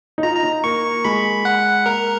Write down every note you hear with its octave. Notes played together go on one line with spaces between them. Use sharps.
D#4
F4 A#5
A#5
D#4
A#3 C#6
G#3 B5
F#5
A#3 A#4